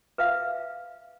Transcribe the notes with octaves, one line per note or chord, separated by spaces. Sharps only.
B4 E5 F5